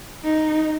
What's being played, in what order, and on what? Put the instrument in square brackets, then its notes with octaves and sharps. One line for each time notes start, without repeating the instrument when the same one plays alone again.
[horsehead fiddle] D#4